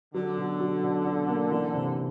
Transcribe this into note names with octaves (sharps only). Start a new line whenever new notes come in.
D3 F#3
B2
F#3
B2
B2
A#3
E3
C3